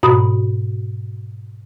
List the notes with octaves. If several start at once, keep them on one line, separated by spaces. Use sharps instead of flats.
G#2 B2 F#4 B5 D#6